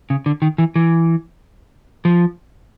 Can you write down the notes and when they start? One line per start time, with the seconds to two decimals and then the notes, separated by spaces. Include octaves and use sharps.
0.10 C#3
0.26 D3
0.42 D#3
0.58 E3
0.76 E3
2.05 F3